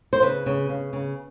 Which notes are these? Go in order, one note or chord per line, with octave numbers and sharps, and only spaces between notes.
C5
C#3 B4
C#3
C#3
C#3